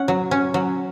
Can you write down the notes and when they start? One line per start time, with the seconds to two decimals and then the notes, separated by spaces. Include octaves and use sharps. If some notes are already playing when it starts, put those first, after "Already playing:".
Already playing: C#4 F#5
0.08 F#3
0.31 C#4
0.54 F#3